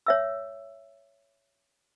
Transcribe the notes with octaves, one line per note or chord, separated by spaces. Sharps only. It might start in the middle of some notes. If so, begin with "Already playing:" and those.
C#5 E5 E6